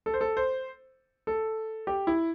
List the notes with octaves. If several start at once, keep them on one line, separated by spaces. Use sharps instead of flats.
A4
C5
A4
C5
A4
G4
E4